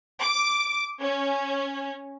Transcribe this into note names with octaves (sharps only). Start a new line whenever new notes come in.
D6
C#4